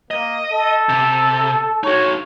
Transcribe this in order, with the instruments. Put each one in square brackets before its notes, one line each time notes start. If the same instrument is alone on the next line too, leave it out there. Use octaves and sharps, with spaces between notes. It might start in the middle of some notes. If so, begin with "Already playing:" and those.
[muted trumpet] A#3 [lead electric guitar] D#5
[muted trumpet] A4
[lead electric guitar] C3
[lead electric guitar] D#4 F#4 [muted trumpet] C#5